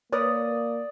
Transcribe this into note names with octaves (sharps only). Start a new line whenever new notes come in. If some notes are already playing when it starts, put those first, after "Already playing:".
A#3 A#4 B4 C#5 D5 D#6